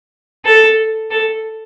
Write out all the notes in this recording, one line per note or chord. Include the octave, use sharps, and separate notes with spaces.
A4
A4